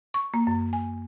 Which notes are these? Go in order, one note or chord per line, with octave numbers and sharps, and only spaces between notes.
C#6
A#3
F#2
G#5